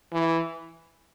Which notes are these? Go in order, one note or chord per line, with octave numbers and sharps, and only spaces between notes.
E3